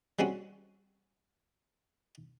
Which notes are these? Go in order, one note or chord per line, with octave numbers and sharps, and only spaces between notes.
G3 G#3 C4 C#4 F#4